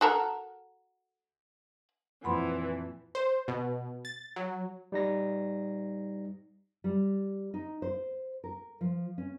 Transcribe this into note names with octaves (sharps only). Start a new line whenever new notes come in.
F#4 A4 A#4
F2 A#2 E3 F3 F#5 B5 C6
C5
B2
A6
F#3
G3 D#4 A#6
G3
D#4
C5
A#4
F3
C#4